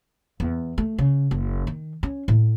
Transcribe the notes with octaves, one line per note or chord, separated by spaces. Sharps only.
E2
A3
C#3
F#1
D#3
C#4
A2